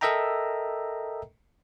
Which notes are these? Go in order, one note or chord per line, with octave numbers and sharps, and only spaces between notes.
A4 A#4 D#5 E5 G5 A#5